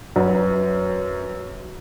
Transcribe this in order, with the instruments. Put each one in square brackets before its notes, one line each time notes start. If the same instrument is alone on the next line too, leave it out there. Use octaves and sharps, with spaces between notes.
[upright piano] F#2 B4